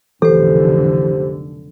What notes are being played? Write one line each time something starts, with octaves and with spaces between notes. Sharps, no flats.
F1 B1 D3 E3 G4 A4 C5